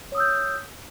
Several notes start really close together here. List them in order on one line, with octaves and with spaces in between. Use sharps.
C#5 D#6 E6 G6